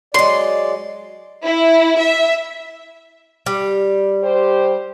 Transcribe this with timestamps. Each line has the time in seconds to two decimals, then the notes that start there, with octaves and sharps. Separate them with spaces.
0.14 F#3 G#3 D5 C6
1.44 E4
1.99 E5
3.46 G3
4.23 G4 C5